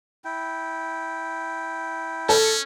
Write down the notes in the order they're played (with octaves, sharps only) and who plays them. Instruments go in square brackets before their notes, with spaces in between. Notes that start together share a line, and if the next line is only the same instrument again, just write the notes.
[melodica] E4 G5
[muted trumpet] C#4 [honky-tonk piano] A4